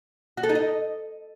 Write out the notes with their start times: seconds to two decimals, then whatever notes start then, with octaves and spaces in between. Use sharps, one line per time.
0.37 F#4
0.43 A4
0.49 D#4
0.55 D#5